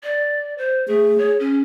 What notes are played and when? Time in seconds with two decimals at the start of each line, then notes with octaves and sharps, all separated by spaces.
0.03 D5
0.58 C5
0.88 A3 G#4
1.18 C#5
1.40 C#4